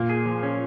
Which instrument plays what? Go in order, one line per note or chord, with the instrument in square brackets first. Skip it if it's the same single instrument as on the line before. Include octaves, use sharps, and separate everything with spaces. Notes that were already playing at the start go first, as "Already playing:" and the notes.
Already playing: [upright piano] A#2 [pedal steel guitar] A#3
[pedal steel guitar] G#4
F3
C#4